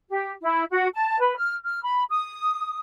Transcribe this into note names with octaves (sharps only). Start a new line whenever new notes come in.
G4
E4
F#4
A5
B4
F6
F6
B5
D#6